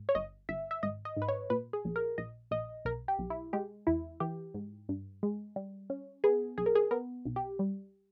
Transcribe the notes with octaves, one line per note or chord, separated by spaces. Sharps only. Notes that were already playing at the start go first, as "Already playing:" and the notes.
Already playing: G#2
C#5
G1 D#5
G1 E5
E5
G#1 D#5
D#5
G#2
B4
C#5
A#2 B4
G#4
A#1
A#4
A#1 D#5
A#1 D#5
B1 A#4
G4
B1
E4
G#3 G4
E2 E4
E3 G4
G#2
G2
G#3
G3
C#4
B3 G#4
B1 G#4
A#4
G#4
B3 A#4
B1
G4
G3